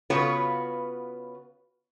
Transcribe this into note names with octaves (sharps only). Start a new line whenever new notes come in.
C#3 B3 F4 F#4 B4 C#5